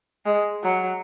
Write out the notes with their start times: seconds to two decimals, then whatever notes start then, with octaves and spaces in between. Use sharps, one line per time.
0.25 G#3
0.63 F#3